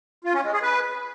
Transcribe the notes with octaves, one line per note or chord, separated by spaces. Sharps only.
F4
C#4
G#3
G#4
B4